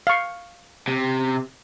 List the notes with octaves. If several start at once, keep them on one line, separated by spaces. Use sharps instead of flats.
F5 C#6
C3